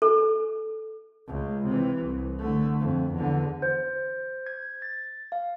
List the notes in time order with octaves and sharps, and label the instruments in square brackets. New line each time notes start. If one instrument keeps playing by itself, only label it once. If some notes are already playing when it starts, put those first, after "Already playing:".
[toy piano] A4
[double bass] C#2
C3 E3
C2
D3 A3
F2
E2 D3
[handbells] C5
G#6
A6
F5